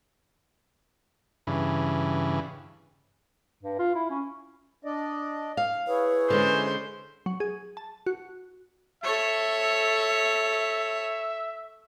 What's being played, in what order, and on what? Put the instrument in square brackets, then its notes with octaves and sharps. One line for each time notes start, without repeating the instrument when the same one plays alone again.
[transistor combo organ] G2 C#3 E3
[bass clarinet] G2
F4
E4
C#4
[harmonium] D4 D5 D#5
[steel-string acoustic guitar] F5
[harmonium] E4 G#4 C#5 [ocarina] B4
[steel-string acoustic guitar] D3 G#3 C#4 [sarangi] C5
[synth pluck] F#3
G#4
A5
F#4
[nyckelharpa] A4 C#5 [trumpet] E5